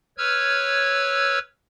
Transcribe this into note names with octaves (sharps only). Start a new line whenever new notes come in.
B4 C#5 E6 F6 G#6